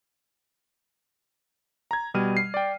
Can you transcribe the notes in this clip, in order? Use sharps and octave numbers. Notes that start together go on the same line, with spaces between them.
A#5 G#6
B2 G3 F6 D#7
C7
D5 G5